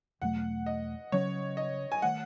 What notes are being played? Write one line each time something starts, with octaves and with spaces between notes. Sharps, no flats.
E2 B2 F#3 A3 F#5
D#5
C#3 F#3 C#4 C#5
D#5
G#5
D#3 A3 F#5